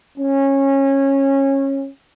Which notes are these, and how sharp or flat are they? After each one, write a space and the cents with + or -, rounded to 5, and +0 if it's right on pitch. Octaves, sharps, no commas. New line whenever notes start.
C#4 -20